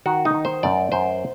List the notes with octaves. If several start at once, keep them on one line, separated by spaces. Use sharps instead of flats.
D#3 F#4
D#4
D#3
C5
F#2 D5
F#2 C5